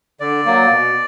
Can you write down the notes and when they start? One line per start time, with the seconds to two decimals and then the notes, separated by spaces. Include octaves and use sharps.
0.20 D3 D5
0.46 F#3 A#3
0.71 B2